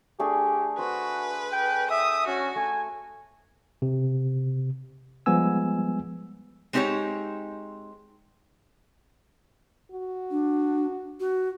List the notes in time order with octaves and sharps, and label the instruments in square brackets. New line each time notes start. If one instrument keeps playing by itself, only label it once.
[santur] A3 D4 G#4 [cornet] G4
[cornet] F#4 [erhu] B4 [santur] C5
[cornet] G5
[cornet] E5 [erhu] D#6
[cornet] C#4 [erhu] F#4
[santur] A3 [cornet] G#5
[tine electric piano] C3
F3 G3 G#3 B3 G#5 E6
[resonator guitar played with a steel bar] G#3 C4 D#4 G4 C5 C#5
[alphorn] F#4
[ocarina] D4
F#4